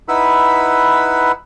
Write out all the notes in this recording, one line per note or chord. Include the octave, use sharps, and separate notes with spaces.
D#4 E4 B4 F#5 B5 E6